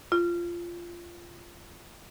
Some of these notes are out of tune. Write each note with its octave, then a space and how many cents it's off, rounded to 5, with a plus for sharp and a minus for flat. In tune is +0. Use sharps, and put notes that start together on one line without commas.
F4 -15